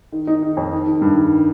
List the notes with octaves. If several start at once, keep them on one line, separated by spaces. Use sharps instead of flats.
D#3
D#4
D#3
F2
D#3
D#3
G2
D#3